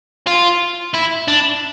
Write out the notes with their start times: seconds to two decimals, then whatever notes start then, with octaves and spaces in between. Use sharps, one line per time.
0.27 F4
0.94 E4
1.28 D4